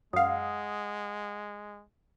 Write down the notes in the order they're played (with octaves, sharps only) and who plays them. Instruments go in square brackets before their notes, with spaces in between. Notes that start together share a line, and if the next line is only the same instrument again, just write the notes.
[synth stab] F#2 F5 [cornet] G#3 [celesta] F#5 D#6